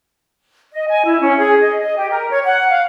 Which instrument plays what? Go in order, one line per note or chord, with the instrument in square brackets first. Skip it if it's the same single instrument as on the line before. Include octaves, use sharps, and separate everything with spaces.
[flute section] D#5
G#5
E4
C#4
G#4
D#5
D#5
G4
A#4
C#5
F#5
F5